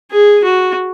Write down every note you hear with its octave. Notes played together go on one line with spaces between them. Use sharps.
G#4
F#4